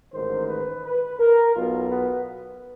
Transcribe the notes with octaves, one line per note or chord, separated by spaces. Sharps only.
A1 G#2 D#3 C5
B4
B4
A#4
B1 B2 F4
B3